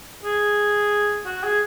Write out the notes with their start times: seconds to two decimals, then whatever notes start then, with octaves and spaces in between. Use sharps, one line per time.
0.23 G#4
1.25 F#4
1.44 G#4